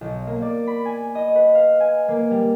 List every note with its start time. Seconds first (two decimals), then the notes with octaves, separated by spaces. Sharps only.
0.01 B1
0.27 A#3
0.42 D5
0.67 B5
0.85 G#5
1.15 D#5
1.35 B4
1.55 F5
1.80 G#5
2.08 A#3
2.31 G3